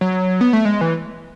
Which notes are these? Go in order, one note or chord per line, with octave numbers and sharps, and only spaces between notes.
F#3
B3
A3
G#3
E3